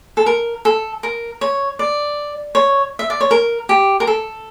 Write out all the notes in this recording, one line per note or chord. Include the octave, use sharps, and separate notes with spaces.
A4
A#4
A4
A#4
C#5
D5
C#5
E5
D5
C#5
A#4
G4
A#4
A4